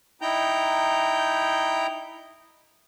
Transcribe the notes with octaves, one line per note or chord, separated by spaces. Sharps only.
D#4 E4 G5 A#5 G6